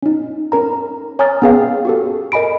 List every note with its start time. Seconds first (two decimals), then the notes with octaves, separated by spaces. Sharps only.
0.02 C#4 D#4
0.52 C#4 A#4 A#5
1.19 C#5 G#5 A#5 D#6 F6 A6
1.42 B3 C#4 G#4 B4 F5 G5
1.85 F#4 G4 A4
2.32 A#4 D#5 G#5 B5 D7